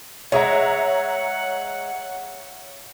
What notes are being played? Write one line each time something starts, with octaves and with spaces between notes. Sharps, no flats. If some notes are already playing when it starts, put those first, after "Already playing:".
G#3 C#5 E5 F#5 A#5